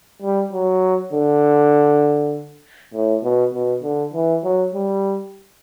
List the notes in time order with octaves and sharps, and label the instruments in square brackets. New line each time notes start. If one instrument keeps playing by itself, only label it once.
[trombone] G3
F#3
D3
A2
B2
B2
D3
E3
F#3
G3